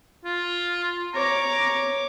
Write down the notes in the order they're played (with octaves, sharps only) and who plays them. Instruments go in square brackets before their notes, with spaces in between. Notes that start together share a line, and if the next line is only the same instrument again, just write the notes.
[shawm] F4
[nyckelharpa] C#5 D6 [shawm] A#5